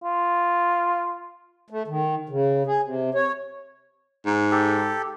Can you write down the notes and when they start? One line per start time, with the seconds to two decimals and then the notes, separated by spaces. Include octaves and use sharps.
0.03 F4
1.70 A3
1.88 D#3
2.29 C#3
2.67 G#4
2.83 C3
3.14 C#5
4.26 G#2
4.52 G4 A4